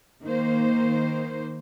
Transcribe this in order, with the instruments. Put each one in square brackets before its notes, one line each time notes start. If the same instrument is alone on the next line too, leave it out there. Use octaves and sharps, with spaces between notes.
[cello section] D#3 A#3 C5